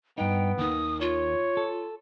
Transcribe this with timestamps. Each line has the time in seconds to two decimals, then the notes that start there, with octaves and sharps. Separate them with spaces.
0.18 G2 B3 D#4 G5
0.58 D#2 D#3 D#6
1.01 F4 C#5
1.57 A4